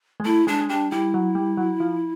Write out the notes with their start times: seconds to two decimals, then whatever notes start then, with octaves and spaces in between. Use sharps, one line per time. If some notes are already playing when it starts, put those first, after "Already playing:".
0.20 G#3
0.25 A3 E4
0.47 G#3 D4
0.61 G#3
0.69 G3 D4
0.91 G3 E4
1.14 F#3
1.35 G3
1.57 F#3
1.80 F3